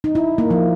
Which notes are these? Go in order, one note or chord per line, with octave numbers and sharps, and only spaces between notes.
D#4
E4
A#3
F3